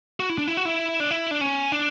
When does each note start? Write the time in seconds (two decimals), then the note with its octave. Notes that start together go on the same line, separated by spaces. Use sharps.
0.20 F#4
0.29 E4
0.38 D4
0.48 E4
0.57 F#4
0.65 E4
1.00 D4
1.11 E4
1.31 D4
1.41 C#4
1.72 D4